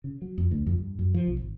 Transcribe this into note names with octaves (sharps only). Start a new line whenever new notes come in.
C#3
F#3
F2
D2
F2
G2
F#2
F3
B1
G#1